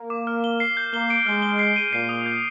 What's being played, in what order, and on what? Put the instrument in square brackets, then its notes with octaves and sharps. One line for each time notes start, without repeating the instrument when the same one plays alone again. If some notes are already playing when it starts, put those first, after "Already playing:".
Already playing: [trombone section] A#3
[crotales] D6
F6
G7
C7
G6
[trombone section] A#3 [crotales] G7
[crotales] D7
[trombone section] G#3 [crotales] F6
[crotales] G7
C7
D#7
[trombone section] A#2 [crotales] C7
[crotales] D#6
G6